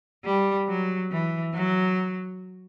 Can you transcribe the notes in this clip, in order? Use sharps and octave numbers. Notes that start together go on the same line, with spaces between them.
G3
F#3
E3
F#3